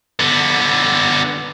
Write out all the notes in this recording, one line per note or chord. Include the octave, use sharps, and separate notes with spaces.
D3 B3